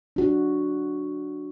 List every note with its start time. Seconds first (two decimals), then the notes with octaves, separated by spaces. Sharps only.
0.16 D4 F#4